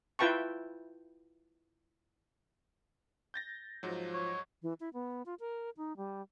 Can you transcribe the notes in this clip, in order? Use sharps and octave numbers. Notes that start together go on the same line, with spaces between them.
E4 F4 B4 G5 A5 C#6
G6 A6 A#6
G#2 F3 F#3
C#5
E3
E4
B3
F4
A#4
D#4
G3